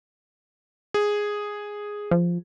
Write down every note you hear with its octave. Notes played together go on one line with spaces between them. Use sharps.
G#4
F3